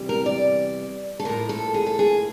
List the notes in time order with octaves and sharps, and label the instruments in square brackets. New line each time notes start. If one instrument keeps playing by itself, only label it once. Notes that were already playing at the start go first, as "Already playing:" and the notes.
Already playing: [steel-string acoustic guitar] E2 C3 E3 G3
A#4
D5
A4
A2 F3 A#3 A#4
A4
G#4
A4
G#4